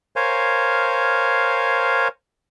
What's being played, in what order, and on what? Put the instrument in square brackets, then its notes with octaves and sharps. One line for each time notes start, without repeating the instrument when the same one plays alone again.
[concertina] A#4 C5 C#5 F5 G#5